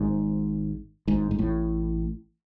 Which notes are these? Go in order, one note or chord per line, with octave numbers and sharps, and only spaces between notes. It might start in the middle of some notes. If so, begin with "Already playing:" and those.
Already playing: G#1 G#2
G#1 G#2
G#2
A1 A2